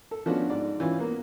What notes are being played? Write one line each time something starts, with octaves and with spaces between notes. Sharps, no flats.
A4
F3 A3 B3 C#4 D4 F#4
G#2 D5
E3 C#4 F4
A#3 B3